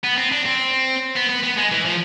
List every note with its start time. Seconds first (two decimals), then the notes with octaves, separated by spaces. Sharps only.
0.04 B3
0.18 C4
0.32 D4
0.46 C4
1.16 B3
1.30 B3
1.43 B3
1.57 G#3
1.72 E3
1.85 F3